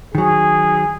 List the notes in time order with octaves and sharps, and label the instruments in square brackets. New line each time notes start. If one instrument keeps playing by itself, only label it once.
[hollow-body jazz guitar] D#3 F#3 [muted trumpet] G#4